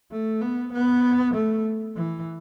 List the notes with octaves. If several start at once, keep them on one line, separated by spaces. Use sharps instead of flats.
A3
B3
B3
A3
E3